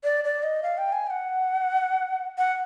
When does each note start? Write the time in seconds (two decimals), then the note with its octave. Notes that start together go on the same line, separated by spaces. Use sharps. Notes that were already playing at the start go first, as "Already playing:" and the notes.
0.04 D5
0.25 D5
0.43 D#5
0.63 F5
0.78 G5
0.92 G#5
1.07 G5
1.10 F#5
2.38 F#5